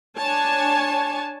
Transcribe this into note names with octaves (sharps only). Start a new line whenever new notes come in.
D4 C#5 G#5 A5